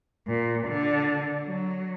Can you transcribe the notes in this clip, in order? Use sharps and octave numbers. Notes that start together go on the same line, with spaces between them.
A#2
D3
F#3